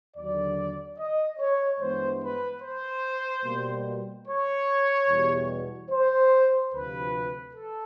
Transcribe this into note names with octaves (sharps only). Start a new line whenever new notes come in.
D#2 D3 F#3 D5
D#5
C#5
G2 E3 G#3 B3 C5
B4
C5
B2 G3 A#3
C#5
E2 B2 G3
C5
D2 C3 F3 B4
A4